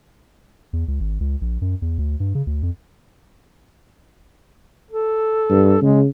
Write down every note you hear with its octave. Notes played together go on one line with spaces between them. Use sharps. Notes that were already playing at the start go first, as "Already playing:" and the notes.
E2
C#2
G#1
C#2
A#1
F#2
E2
D2
G2
C#3
D2
F2
A4
G2
C#3 G#3